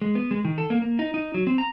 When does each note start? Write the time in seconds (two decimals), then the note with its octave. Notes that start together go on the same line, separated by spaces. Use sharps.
0.02 G#3
0.15 B3
0.31 G#3
0.45 D#3
0.58 A4
0.70 A#3
0.82 A#3
0.99 D#4
1.14 D#4
1.34 F#3
1.47 C4
1.58 A#5